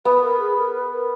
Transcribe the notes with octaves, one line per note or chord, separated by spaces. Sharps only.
B3 B4
B4
A#4
G#4
A#4
B4
A#4